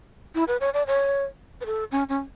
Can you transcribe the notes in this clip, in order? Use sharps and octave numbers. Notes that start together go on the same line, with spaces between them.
E4
B4
C#5
D5
C#5
B4
A4
C#4
C#4